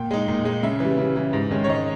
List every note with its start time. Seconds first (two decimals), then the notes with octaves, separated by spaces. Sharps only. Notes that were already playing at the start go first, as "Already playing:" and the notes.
Already playing: A#2 G5
0.11 G#3 D#4
0.28 A#2
0.45 G#3 D#4
0.63 C#3 E5
0.80 E3 G3
0.98 C#3
1.16 E3 G3
1.33 G#2
1.51 D#3 G#3 C#4
1.64 C#5
1.70 G#2 D#5